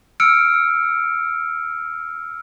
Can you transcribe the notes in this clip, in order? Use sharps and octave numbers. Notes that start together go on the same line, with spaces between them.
E6 F6 C#7 D7